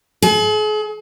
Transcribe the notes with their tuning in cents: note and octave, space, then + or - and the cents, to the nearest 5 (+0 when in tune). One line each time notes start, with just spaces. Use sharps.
G#4 +45